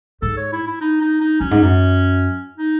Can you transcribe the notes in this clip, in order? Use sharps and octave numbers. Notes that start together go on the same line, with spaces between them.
G#2 A4
C#5
E4
E4
D#4
D#4
D#4
F#2 C#4
G#2
F#2
D#4